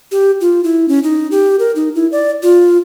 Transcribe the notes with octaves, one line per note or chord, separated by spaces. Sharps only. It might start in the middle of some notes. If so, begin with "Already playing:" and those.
G4
F4
E4
C#4
D#4
G4
A#4
D#4
E4
D5
F4